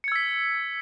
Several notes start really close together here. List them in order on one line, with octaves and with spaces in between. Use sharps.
C#7 G#6 E6 B6